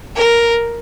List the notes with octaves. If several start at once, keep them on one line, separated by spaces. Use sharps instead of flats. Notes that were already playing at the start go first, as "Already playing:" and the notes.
A#4